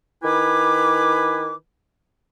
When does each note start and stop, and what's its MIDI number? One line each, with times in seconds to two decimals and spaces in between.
0.23 1.54 51
0.23 1.54 64
0.23 1.54 71
0.23 1.54 80
0.23 1.54 86